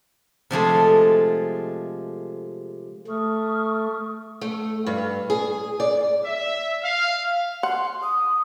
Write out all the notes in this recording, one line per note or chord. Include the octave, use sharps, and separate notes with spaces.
C3 F3 G#3 A3
A3 C#6 D#6 F6
A3
G2
G#4
D5
E5
F5
F#5 C6
D#6